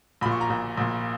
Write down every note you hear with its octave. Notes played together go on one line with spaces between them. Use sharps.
A#1 A#2 B5
C#6
A#5
A#1 A#2
A#1 A#2